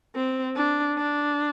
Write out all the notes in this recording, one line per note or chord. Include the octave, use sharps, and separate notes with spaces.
C4
D4
D4